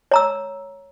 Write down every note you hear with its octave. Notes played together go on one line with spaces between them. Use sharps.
C#5 A#5 E6